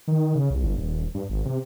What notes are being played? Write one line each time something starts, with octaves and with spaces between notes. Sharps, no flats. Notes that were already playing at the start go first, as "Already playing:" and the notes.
D#3
C#3
C2
G1
D#1
G2
G#1
C3